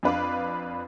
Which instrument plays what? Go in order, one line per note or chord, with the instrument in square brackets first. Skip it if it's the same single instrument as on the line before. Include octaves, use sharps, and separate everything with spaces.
[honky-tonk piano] F2 D4 B4 F5 D6